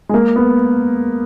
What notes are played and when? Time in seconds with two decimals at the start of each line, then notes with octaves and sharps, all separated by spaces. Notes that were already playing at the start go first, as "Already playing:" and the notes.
0.09 G#3
0.14 A#3
0.36 B3